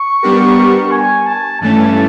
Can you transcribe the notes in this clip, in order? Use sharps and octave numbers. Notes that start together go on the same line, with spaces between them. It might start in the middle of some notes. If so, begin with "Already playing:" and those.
Already playing: C#6
G3 B3 D4 G4 A#4
G#5
A5
G2 E3 A3 C#4 A5